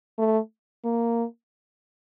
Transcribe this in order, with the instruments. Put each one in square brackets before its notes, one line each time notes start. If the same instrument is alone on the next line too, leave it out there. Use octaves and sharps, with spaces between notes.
[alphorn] A3
A#3